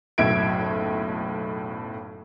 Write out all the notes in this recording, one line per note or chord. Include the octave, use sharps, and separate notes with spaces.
F#1 B1 A2 E5 G#6 D7